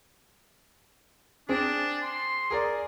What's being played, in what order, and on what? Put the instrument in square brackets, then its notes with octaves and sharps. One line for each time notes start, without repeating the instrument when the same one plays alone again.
[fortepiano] C4 G#4 [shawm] D4
[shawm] C6
[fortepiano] G#4 A#4 D5